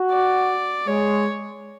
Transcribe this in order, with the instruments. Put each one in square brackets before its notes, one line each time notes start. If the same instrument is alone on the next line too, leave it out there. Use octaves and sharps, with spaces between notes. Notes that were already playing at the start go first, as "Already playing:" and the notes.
Already playing: [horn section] F#4
[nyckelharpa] D5
[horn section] G#3 [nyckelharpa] C#5